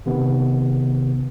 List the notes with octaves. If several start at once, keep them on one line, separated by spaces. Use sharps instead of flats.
C3 D#3 B3